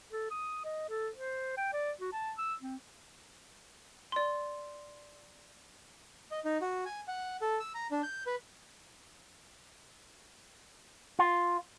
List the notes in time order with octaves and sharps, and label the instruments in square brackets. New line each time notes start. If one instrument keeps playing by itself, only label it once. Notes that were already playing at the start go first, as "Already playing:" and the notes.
[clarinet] A4
D#6
D#5
A4
C5
G5
D5
F#4
A5
E6
C4
[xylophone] D5 C6
[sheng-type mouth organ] D#5
D#4
F#4
G#5
F#5
A4
E6
A#5
D4
G6
B4
[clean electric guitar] F4